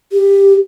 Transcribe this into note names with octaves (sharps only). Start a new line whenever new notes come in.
G4